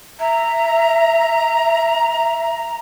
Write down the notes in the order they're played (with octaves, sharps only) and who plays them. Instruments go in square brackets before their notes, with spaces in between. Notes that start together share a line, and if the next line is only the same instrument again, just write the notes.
[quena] E5 [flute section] A#5